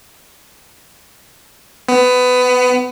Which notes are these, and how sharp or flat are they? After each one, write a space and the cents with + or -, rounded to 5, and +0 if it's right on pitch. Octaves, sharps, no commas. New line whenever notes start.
B3 +20